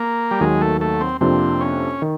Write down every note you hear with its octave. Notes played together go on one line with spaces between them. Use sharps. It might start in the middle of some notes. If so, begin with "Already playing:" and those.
Already playing: A#3
G3
D#2 D#3 F#3 G#3
A3
A3
C4
F2 C3 F3 A#3 C4 D4
C#4
D#3